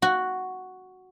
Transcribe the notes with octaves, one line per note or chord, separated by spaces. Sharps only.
F#4